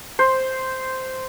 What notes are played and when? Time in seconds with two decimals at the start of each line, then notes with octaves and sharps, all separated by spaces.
0.19 C5